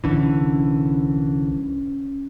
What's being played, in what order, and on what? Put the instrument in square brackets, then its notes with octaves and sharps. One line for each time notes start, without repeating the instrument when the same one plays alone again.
[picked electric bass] C2 D3 E3 [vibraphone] C#4